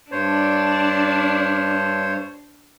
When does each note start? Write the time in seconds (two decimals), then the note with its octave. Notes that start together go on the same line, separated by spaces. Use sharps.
0.12 G2 D4 C5 C#5